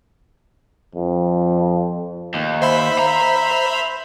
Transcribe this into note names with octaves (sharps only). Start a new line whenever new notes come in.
F2
D#2
C5 E5 B5
A#5